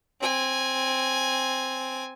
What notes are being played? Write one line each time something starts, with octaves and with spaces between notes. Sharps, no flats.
C4 G#5